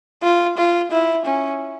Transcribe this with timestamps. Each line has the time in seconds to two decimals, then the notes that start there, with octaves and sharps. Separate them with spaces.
0.23 F4
0.57 F4
0.91 E4
1.25 C#4